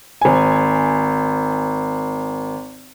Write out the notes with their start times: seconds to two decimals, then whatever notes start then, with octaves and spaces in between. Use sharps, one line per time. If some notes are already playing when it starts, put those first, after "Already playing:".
0.21 G#1 G#5